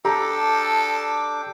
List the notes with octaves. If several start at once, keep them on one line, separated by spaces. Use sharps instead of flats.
D4 G4 A4 G5 A5 A#5 D6